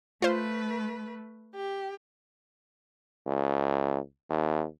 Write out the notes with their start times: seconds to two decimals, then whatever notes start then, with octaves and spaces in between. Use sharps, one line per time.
0.22 A3 F4 B4 C5
1.55 G4
3.27 C#2
4.30 D#2